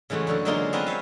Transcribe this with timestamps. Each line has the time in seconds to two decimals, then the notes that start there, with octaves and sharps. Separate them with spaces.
0.10 C#3 E3 G#3 A3 F#4
0.27 F#2 D3 G#3 A4
0.45 D3 F#3 G#3 A#3 D#4 F4
0.73 B3 C4 F4 B4 G#5 A#5
0.86 C5 C#5 E5 F5